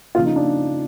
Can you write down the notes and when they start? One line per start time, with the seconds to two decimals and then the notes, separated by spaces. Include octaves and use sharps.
0.15 C#3 F3 A#3 F4
0.25 D#4
0.36 D4